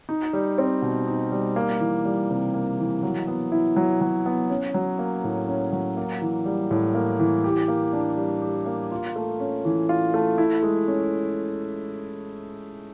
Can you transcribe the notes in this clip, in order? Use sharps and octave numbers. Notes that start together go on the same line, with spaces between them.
D#4
G3
C4
B2
D#4
G3
A#3
E3
G3
C3
A#3
E3
F#3
B3
E4
F#3
F#3
B3
C#4
F#3
A#3
A2
C#4
F#3
A#3
E3
G3
A2
A#3
E3
G4
A#3
D4
G3
G4
A#3
F4
A3
C#4
E3
F4
A3
E4
G#3
C#4